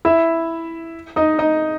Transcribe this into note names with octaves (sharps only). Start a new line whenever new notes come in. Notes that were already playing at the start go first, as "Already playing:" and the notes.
E4 E5
D#4 D#5
D#4 D#5